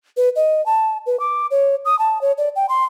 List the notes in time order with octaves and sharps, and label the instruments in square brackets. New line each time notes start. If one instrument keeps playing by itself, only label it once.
[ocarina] B4
D#5
A5
B4
D6
C#5
D#6
A5
C#5
D5
G5
C6